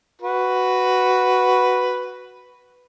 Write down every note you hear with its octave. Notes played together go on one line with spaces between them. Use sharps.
F#4 B4